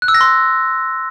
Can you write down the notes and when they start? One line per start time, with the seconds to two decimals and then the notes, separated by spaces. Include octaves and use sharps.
0.02 F#6
0.08 E6
0.14 A#6
0.21 C6